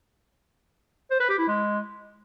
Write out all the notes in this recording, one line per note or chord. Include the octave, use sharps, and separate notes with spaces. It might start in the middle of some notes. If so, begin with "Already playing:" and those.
C5
B4
G4
E4
G#3